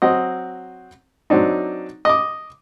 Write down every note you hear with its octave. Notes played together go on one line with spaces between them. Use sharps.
F#3 C4 F#4 D#5
F#3 C4 D4 D#4
D#5 D6